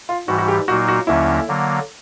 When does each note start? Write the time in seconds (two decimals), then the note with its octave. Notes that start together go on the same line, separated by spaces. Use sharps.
0.09 F4
0.28 G#2 E3 G3 F#4
0.38 F#4
0.48 G4
0.68 A#2 F#3 A#3 D#4 F#4
0.88 F#4
1.07 D#2 D3 F#3 A#3 C#4 E4
1.48 D3 F#3 A#3